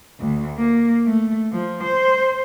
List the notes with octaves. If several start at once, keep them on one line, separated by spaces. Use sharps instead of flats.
D2
A#3
A3
F3
C5